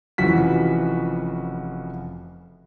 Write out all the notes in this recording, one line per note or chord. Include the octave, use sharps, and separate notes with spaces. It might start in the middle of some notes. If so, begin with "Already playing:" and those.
F1 C#3 E3 F3 F#4 B6